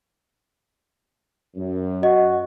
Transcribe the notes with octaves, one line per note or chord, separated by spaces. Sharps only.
F#2
F#4 D#5